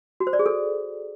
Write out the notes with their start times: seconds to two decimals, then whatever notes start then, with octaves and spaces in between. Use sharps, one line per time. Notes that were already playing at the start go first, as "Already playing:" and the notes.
0.20 F#4
0.27 C5
0.33 D5
0.39 G#4
0.46 A4